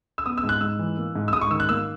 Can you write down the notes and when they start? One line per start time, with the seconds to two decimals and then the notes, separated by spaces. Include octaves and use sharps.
0.18 E6
0.26 B3 D#6
0.38 E6
0.44 G#2
0.49 F#6
0.61 G#2 E6
0.79 E3
0.97 A#3
1.15 G#2
1.28 E6
1.33 G#2 D#6
1.41 C#6
1.51 D#3 E6
1.60 F#6
1.69 A#3 E6